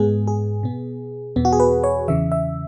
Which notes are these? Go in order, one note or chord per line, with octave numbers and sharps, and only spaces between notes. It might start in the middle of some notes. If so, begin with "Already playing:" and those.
Already playing: G#2 G#3 B3 G#4
G#4
B2 B3
E2 B2 B3
F#4
G#4
B4
C#5
E2 C#3 E3 E5
E5